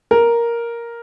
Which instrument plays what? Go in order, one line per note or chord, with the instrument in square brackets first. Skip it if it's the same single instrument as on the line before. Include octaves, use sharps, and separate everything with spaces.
[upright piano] A#4